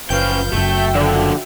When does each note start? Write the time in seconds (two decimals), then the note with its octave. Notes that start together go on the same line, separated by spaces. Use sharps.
0.10 F#1 C#3 F3 C#4 B4 F5 G5 G6
0.53 F#1 F#2 A3 F#4 E5 G5
0.95 D3 F3 F#3 A#3